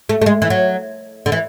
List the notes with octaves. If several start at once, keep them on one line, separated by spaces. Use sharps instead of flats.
A3
A3
G#3
E3
F#3
D3
E3